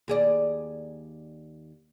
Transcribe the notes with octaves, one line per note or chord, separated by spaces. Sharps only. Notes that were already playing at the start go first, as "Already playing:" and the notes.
D#2 G#4 D5